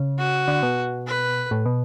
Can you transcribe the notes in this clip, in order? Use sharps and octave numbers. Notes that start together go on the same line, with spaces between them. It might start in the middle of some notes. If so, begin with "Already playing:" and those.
Already playing: C#3
F#4
D3
B2
B4
A2
B2